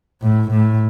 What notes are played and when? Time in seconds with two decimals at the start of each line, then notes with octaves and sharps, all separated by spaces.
0.22 A2
0.51 A2